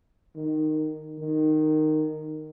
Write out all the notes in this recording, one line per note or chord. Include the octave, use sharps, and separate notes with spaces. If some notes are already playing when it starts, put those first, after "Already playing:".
D#3
D#3